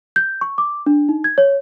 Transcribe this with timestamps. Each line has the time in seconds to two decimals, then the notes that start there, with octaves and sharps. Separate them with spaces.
0.16 G6
0.41 C#6
0.58 D6
0.86 D4
1.09 D#4
1.24 G#6
1.38 C#5